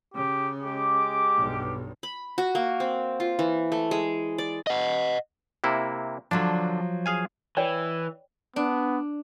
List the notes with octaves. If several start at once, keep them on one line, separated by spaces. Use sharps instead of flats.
C#3 G4
G#3 G4 D6
B1 G2
B5
F#4
A#3
C4
F4
E3
A3
G#3
D5
D#5 F#5
C3 A#3 E4
D3 F3 F#3 D4
G#4 F5 G#5
E3 C#5 D5 G5
B3 D4